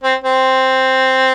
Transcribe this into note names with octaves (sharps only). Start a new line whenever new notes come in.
C4
C4